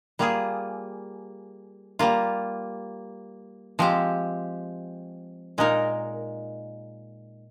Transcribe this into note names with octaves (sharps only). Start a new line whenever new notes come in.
G3 A#3 F4 G#4
G3 A#3 F4
F3 G#3 C4 G4
A#2 G#3 D#4 A#4